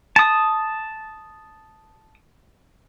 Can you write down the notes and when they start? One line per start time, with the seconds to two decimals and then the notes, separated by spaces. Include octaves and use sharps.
0.16 A5 D#6